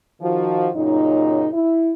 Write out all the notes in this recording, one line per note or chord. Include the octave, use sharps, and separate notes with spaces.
D#3 F3 F#4
F#2 A#2 C#3 D#4
E4